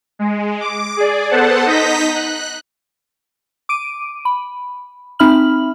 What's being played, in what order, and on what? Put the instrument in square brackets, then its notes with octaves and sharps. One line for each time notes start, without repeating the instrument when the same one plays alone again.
[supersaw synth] G#3
D6
G#4 D5
B3 A4 C5 F#5 A5
D#4 D#5 G6 A#6 B6
F#6
[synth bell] D6 D7 D#7
B5
C4 D#4 E5 B5 F6 F#7